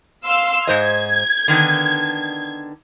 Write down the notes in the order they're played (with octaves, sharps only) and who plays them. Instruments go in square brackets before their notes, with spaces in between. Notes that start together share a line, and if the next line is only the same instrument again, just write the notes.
[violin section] F5 C6 E6
[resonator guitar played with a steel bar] G#2 C5 D#5 [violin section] G#6
[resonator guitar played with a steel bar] D3 D#3 B3